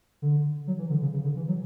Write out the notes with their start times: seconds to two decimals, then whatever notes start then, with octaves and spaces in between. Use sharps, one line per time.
0.22 D3
0.67 F#3
0.78 E3
0.90 D3
1.02 C#3
1.13 C#3
1.24 D3
1.36 E3
1.48 F#3